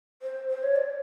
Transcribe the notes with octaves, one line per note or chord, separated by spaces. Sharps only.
C5
C5
C#5
D5